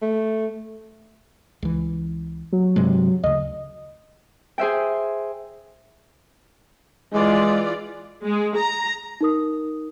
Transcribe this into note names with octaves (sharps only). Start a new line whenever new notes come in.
A3
C#2 E3
F#3
G2 C3 G#3
D2 C#3 D#5
G#4 C5 E5 G5
E3 G#3 F4 D5
G#3
A#5
D#4 A#4 D#6